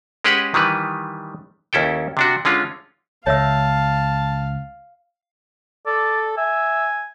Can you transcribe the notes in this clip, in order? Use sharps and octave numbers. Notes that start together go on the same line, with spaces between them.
G#3 C#4 G4 G#4 B4 F#5
D#3 E3 G3 B4
D#2 C#4 E4 A4 G5
C3 D4 F#4
D3 G#3 C#4 F4
C#2 C#5 E5 F5 A5 E6
A4 D5
E5 G#5